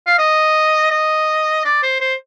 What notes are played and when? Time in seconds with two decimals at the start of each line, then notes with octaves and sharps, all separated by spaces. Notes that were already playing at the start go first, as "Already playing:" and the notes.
0.07 F5
0.19 D#5
0.91 D#5
1.65 D5
1.83 C5
2.00 C5